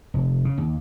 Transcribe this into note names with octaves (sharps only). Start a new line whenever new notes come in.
F1
C#3
D#2